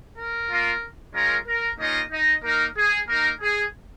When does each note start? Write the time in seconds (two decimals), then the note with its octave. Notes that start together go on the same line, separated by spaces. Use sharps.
0.17 A#4
0.50 A#3 F4
1.14 G#3 C#4 F4 A#4
1.48 A#4
1.79 A#3 C#4 D#4 F4 D#5
2.12 D#4 D#5
2.44 A#3 D#4 A#4
2.77 G#4
3.08 A#3 D#4 A#4
3.42 G#4